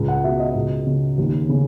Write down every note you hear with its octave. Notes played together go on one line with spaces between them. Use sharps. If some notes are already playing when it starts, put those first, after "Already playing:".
Already playing: C#2
F#5
B2 E5
D#5
C#2
C#3
D#2
C#3